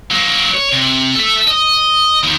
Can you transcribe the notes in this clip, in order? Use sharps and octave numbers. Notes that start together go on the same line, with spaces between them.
F#3 A#3
C#5
C3
A4 E5
D#5
D#2 D#3